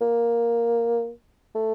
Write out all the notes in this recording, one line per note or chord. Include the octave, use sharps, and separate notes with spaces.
A#3
A3